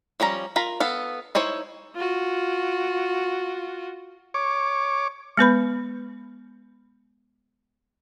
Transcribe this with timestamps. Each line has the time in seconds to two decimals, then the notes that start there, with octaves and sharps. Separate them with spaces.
0.20 F3 G3 C#4 A#5
0.56 F4 A#4 A#5 B5
0.80 B3 A4 F5
1.35 D#4 E4 C5 C#5
1.95 F4 F#4
4.34 C#5 D6
5.37 G#3 B3 B4 B5